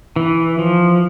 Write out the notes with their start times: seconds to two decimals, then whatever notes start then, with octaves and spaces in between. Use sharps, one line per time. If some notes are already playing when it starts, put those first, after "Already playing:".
0.16 E3
0.59 F3